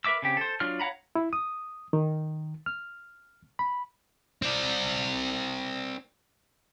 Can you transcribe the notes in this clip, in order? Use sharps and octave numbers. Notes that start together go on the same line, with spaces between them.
A#4 B4 E5 D6 E6
C#3 C4 G4
A4 C5
F#3 D4 F4 F6
C#5 F5 F#5 A#5 B5
E4
D#6
D#3
F6
B5
C4 D5